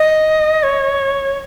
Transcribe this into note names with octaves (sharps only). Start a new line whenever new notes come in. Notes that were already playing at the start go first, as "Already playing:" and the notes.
Already playing: D#5
C#5